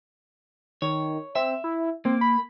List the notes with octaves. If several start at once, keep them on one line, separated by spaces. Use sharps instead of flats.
D#3 C#5
C4 E5
E4
A#3 C4
B5